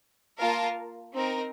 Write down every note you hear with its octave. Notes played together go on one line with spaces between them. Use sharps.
A#3 F4 A#4 F5 A5
C4 D#4 A#4